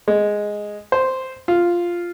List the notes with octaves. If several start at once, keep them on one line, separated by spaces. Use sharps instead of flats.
G#3
C5
F4